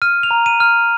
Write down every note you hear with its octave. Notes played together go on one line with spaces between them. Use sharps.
F6 D#7
F7
A#5
D#7
F6